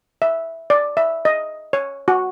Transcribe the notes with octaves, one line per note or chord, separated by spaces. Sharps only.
E5
D5
E5
D#5
C#5
F#4